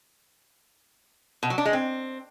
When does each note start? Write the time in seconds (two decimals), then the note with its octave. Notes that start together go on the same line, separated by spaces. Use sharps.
1.43 B2
1.50 F#3
1.58 D4
1.65 G#3
1.73 C4